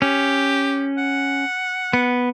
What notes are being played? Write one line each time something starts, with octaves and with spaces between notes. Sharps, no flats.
C#4 G4
F#5
B3